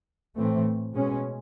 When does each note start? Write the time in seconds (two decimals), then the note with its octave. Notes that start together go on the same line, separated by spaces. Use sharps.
0.37 A2 E3 A3 C4
0.94 B2 G#3 C#4